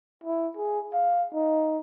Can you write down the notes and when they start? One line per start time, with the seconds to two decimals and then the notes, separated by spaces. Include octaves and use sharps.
0.24 E4
0.57 G#4
0.94 F5
1.33 D#4